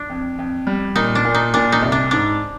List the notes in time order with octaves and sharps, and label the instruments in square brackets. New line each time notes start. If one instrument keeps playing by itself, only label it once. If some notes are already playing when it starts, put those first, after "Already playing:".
Already playing: [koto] D4
[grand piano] F2
F2
G3
[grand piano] A#2 [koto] D#4
[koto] D4
[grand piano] A#2
[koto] D#4
[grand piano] A#2 [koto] D4
[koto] D#4
[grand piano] C2
[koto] D4
[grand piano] G#2 [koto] D4